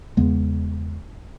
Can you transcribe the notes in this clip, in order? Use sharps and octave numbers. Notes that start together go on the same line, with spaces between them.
E2 C#3 G#3 B3